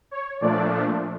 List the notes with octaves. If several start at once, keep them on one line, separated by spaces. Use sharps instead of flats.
C#5
A#2 F3 A3 D4 D5